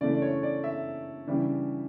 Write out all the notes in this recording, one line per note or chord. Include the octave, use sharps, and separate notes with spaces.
C#3 E3 A3 D4 D5
D5
C#5
D5
E5
C#3 E3 G3 D4